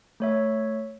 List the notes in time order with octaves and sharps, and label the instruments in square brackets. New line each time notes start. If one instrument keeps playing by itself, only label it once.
[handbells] A3 C#5 E5